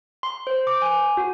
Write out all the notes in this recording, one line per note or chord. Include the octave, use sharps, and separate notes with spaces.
C6
C5
D6
G#5
F#4